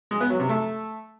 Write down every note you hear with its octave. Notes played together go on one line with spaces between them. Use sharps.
G#3
B3
F#3
C3
A3